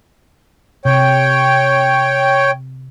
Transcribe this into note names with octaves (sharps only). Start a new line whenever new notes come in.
C3 C#5 G5